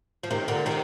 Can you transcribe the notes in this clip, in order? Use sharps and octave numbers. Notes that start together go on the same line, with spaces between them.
F3
C3 D#3
A#2 D3
C3 D#3